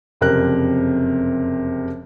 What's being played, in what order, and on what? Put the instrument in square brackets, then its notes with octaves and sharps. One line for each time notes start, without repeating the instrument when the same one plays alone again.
[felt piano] F#1 F2 C3 A#4 F#6